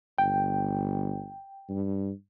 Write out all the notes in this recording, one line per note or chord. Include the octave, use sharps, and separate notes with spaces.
G1 G5
G2